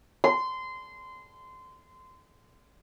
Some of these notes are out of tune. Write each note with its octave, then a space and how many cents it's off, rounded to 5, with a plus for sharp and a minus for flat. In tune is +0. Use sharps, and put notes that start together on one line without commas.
C6 -20